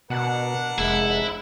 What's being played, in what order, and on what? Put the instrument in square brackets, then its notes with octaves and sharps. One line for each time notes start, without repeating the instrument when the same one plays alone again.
[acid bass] B2 [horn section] D4 A#4 F#5
[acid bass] F1 [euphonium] G#3 [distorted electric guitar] E4